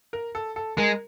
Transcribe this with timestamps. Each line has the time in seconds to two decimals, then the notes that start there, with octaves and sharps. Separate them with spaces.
0.13 A#4
0.35 A4
0.56 A4
0.77 G#3 A#4